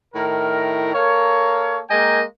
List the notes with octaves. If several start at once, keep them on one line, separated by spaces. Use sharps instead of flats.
A2 D#3 E4 A#4
A#3 A4 A#4 C#5
G#3 A#3 A#4 D#5 G5 G#5